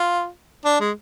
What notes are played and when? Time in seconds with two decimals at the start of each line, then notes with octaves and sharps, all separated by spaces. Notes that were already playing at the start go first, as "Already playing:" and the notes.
Already playing: F4
0.65 D4
0.80 G#3